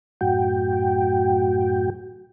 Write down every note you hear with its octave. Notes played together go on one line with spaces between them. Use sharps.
F#2 A2 F#4 G5